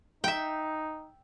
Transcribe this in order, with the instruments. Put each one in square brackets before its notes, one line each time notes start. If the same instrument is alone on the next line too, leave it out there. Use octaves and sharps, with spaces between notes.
[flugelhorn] D#4 [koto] E5 G5